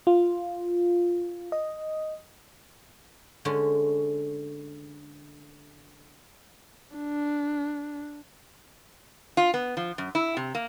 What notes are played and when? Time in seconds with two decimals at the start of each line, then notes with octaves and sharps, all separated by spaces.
0.07 F4
1.52 D#5
3.45 D3 G#3 C#4
6.97 D4
9.37 F4
9.54 B3
9.77 F3
9.98 F#2
10.15 E4
10.37 C3
10.55 A#3